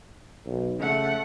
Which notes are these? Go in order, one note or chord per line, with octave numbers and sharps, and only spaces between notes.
B1
C#3 A3 F#5